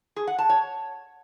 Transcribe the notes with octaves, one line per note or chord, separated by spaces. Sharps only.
G#4
F#5
A5
C#5